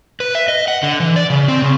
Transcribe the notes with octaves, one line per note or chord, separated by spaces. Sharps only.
B4
E5
D#5
F#5
D3
E3
D5
C#3
C4
C#3